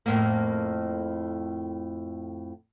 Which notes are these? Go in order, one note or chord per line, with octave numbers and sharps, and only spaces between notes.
F2 A2 A#3